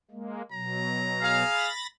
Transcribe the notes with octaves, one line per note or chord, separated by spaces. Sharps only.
G#3 A#3
B2 F#3 A#5
G#4 F5
B5 A6 A#6